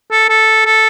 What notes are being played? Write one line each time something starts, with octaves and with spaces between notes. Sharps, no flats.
A4
A4
A4